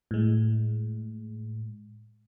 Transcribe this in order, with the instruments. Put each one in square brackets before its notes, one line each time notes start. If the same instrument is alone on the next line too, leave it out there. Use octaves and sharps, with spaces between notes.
[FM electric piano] A2 G#3